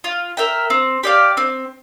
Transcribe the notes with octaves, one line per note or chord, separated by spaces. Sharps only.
F4
A#4 E5 G5
C4
G4 D5 F5
C4